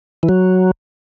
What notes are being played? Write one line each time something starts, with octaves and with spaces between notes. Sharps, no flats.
E3
F#3